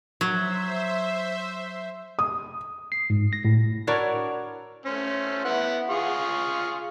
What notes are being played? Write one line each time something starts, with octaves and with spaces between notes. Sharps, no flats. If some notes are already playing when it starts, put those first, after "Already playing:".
F#3 C5 E5
D#6
C7
G#2
A#6
A2
D4 E4 F#4 A#4 C#5 D5
A3 C#4 C5
B3 E4 F#5
F4 G#4 C#6